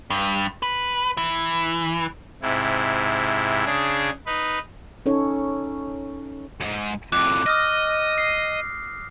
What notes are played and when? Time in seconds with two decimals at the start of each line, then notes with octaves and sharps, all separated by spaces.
0.10 G2
0.63 B4
1.17 E3
2.42 G#2 C3 E4
3.66 C#3 D4 G#4
4.26 D#4 B4
5.06 C#4 D#4 A4 C#5
6.61 F2 G#2
7.12 F2 A2 D6 F#6
7.46 D#5 D#6 F6 A#6
8.18 C7